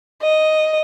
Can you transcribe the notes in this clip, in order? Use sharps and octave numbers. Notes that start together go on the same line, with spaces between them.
D#5